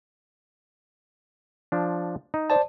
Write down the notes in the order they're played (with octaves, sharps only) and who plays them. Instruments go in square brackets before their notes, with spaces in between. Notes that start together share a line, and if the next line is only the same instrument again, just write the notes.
[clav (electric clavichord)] F3 D4
D#4
[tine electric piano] C5 D5 A5